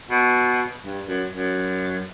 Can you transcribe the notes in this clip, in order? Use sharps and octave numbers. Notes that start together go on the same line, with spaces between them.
B2
G2
F#2
F#2